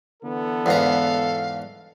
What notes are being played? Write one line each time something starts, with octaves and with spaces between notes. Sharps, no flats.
D3 E3 B3 A4
E2 G#2 F5 A#5